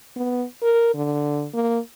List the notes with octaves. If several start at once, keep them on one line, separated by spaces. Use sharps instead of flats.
B3
A#4
D3
A#3